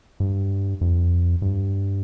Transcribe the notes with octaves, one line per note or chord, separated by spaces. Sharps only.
G2
F2
G2